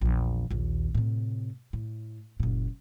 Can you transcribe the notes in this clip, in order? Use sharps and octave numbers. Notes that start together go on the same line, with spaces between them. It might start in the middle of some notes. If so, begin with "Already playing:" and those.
A#1 E2
A#1 D#2
A2 C3
A2
F#1 A#2